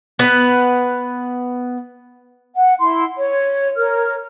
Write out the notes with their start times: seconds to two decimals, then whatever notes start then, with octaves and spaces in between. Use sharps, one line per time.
0.19 B3 B4
2.55 F#5
2.80 E4 C6
3.17 C#5
3.77 A#4 C#5 F6